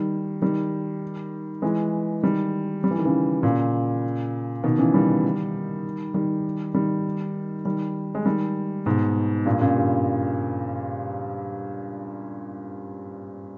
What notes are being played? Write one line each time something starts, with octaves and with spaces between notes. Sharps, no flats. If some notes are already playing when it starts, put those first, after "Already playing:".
Already playing: D#3 G3
D#3 G3
E3 G#3
D#3 G3
G3
E3
D#3
C#3 E3
A#2 C#3
B2 D#3
C#3 E3
D#3 G3
D#3 G3
D#3 G3
D#3 G3
G#3
D#3 G3
G#2 B2
G2 A#2
A#2 C#3
G2